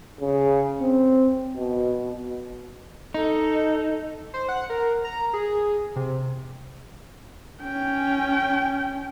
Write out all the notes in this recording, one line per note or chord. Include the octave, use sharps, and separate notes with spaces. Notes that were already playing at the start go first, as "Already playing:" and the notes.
C#3
C4
B2
D#4 A4
C5
F#5
A#4
A#5
G#4
C3
C#4 G5